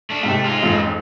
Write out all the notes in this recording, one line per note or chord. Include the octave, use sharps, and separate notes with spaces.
A3 D4
G#2 C3 A3 G4
G#3 F4
A1 F2 G#2